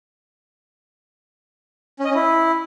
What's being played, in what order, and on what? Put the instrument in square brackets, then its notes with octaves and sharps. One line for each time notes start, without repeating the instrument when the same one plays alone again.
[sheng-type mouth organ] C#4
D#5
C#4
E4